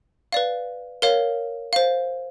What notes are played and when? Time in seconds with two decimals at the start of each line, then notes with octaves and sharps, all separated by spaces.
0.32 B4 D5 F5
1.02 A#4 C#5 F5
1.73 C5 F5